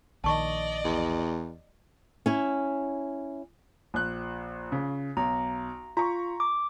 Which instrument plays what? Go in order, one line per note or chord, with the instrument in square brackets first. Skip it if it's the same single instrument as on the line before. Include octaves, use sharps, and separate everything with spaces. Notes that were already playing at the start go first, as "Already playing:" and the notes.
[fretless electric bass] A#1 D#3 [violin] D5 D#5 [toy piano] A5 C#6
[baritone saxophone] E2
[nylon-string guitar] C#4 E4
[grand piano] A#1 F#6
C#3
[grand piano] B1 [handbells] A#5
[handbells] F4 [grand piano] A#5 C#6
[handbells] D6